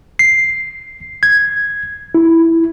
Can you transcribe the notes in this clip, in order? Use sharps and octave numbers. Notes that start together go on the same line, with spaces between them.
C7
G#6
E4